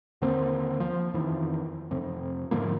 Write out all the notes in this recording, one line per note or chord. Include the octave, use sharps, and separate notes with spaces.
D#2 D3 A#3 C4
F3
F2 D#3 E3
F2 C3
G#2 D3 F3 A#3